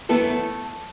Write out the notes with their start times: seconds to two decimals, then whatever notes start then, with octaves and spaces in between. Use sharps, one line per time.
0.09 F#2 E3 A3 B3 E4 A4